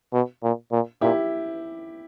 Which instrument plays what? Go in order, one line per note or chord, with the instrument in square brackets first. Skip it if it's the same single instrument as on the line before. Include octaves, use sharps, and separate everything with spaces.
[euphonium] B2
A#2
A#2
[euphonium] A#2 [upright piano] E4 G4